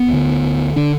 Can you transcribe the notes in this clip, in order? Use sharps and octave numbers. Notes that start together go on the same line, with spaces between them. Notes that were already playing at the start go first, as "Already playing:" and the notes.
Already playing: B3
D2 D3
D3 D4